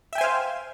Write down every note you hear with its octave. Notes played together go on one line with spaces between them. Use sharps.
C5 E5 F5 G5 G#5